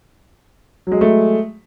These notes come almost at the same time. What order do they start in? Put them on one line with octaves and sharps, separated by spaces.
F#3 G#3 G#4 A3